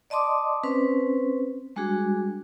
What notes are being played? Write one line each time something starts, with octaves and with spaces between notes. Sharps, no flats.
D5 D#5 A5 C6 D6 D#6
C4 C#4 B4 C5
G3 G#3 D4 F#4 G#4